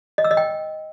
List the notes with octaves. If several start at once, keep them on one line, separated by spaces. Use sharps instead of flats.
D#5
E6
D#5
G5